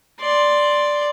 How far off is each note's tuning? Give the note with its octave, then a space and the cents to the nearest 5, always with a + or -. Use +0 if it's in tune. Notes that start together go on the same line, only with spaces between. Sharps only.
D5 +0 C6 +0